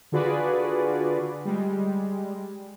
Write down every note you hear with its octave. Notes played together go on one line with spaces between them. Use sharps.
D3 F4 F#4 G#4 B4 D5
G3 G#3